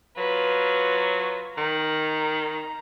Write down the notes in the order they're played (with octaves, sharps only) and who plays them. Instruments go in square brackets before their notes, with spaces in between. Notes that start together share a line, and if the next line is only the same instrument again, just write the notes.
[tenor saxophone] F#3 [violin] F4 B4
[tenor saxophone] D#3 [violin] A#5